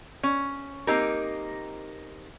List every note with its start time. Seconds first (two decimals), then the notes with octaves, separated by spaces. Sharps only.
0.23 C#4
0.87 A#3 C4 D#4 G4 A#4